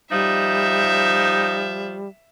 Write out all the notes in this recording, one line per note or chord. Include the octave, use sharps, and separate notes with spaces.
F3 G3 D#4 E5